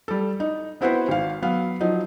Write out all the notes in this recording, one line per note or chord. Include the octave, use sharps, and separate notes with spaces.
G3 A4
D#4
B3 C4 E4 F#4 B4 C5
G#1 F5
F#3 B3 F5
F3 F#3 D#4